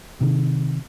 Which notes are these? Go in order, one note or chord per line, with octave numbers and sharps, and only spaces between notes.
C3 D#3